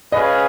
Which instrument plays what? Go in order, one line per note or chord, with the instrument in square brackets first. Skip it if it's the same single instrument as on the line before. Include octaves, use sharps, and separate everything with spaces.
[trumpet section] C#4 G#4 B4 F5 [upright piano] D#5